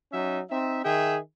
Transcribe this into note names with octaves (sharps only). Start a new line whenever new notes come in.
F#3 C#4 D#4 E5
C4 D#4 E5
D#3 G#4 E5 G5